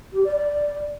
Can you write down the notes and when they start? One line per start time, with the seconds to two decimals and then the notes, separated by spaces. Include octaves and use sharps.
0.13 G4
0.24 D5
0.36 D5